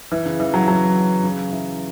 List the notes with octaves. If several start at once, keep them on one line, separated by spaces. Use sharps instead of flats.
E3
C#3
E3
F#3
F#3
C#3
E3